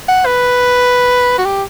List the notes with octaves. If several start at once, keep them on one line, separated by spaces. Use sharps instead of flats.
F#5
B4
F#4
G4